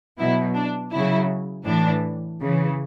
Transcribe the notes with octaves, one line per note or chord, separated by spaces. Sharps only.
B2 F#3 E4
D4
C#3 F#3 E4
A2 E3 D4
C#3 E3